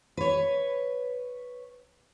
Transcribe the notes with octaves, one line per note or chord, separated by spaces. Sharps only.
B4 C#5